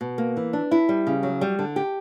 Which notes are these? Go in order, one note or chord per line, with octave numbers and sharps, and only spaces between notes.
B2
A#3
E3
D4
E4
G3
C#3
F#3
G3
D3
G4